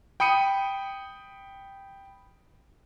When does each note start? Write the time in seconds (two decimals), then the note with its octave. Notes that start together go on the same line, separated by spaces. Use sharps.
0.20 G5 B5 D#6 C#7 D#7